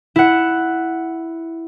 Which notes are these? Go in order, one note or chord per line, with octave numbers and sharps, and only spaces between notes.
E4 F#5